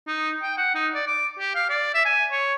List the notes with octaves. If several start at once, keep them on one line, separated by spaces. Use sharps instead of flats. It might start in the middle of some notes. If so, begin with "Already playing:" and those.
D#4
G5
F#5
D#4
D5
D6
G4
F5
D5
E5
G#5
C#5